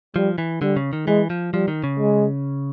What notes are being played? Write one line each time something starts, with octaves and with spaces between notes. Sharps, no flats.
F3 G3
E3
D3 G3
C#3
D#3
E3 G#3
F3
F3 G3
D#3
C#3
G#3